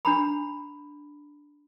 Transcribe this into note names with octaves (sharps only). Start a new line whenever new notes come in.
D4 A#5 B5